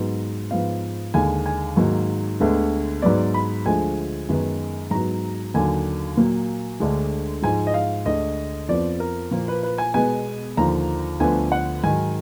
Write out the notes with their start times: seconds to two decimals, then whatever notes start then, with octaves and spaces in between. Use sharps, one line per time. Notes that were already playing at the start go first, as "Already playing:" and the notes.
Already playing: G#2 F#3 B3
0.51 G#2 F3 B3 F5
1.14 D#2 D3 G#3 G#5
1.46 G#5
1.76 G#2 D#3 F#3 A#3
2.40 D2 D3 G#3 B3
3.02 G#2 F#3 B3 D5
3.34 B5
3.66 D2 D3 F3 G#3 G#5
4.29 F#2 D#3 G#3 B3
4.91 G#2 F#3 B3 A#5
5.54 D#2 D3 F#3 G#5
6.17 A#2 F#3 A#3
6.80 D2 D3 G#3
7.42 G#2 F3 G#3 G#5
7.67 D#5
7.74 F5
8.06 D2 D3 G#3 D#5
8.68 F2 F3 B3 D5
9.00 A#4
9.31 A#2 F3 A#3
9.48 B4
9.63 B4
9.78 G#5
9.94 B2 G#3 B3 G#5
10.57 D#2 D3 F3 A#5
11.20 D2 D3 F3 B3 G#5
11.52 F#5
11.83 G#2 D#3 F#3 G#5